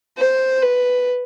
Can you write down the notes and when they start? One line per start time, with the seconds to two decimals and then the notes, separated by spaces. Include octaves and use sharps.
0.18 C5
0.62 B4